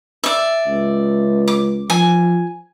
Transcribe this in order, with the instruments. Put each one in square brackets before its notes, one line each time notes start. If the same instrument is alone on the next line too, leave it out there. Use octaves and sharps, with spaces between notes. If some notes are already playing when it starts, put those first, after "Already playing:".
[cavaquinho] D5 E5
[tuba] C#2
[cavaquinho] D6
[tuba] F3 [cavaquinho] G#5